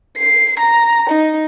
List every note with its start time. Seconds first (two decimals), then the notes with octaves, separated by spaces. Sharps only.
0.18 C7
0.60 A#5
1.10 D#4